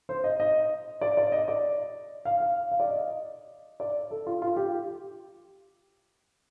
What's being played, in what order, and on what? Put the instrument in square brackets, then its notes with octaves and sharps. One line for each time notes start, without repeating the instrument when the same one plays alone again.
[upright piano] C5
D#5
D#5
D5
D5
D#5
D5
F5
F5
F5
D5
D#5
D5
A4
F4
F4
G4